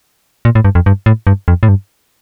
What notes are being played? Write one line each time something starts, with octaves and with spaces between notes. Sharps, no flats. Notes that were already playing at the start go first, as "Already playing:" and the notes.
A#2
A2
G2
F2
G2
A2
G2
F2
A2
G2